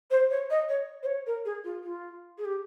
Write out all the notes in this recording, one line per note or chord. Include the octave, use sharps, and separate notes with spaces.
C5
C#5
D#5
C#5
C5
C#5
A#4
G#4
F4
F4
G#4
G4